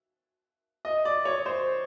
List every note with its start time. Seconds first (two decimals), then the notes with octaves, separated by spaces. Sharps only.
0.85 D#5
1.05 D5
1.25 C#5
1.46 C5